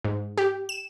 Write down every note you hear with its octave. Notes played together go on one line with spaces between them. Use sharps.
G#2
G4
E7